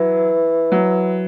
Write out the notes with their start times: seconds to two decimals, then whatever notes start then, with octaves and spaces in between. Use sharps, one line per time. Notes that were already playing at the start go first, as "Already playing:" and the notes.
Already playing: E3 F#3
0.72 F#3